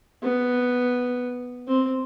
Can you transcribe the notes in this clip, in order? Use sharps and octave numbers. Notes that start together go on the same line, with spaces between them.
B3
C4